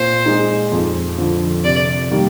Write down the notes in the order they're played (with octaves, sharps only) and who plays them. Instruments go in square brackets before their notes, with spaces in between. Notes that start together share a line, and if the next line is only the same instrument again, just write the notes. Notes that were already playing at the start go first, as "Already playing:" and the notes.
Already playing: [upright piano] A#2 [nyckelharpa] C5
[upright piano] G#3 D#4
F2
D3 F3
[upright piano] C3 [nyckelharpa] D5
[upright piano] D#3 G3 A#3